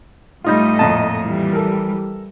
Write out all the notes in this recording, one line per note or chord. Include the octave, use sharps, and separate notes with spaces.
A2 G3 A3 D#4 F4 D#5
F2 A#2 A5
E3 G3
A4 A#4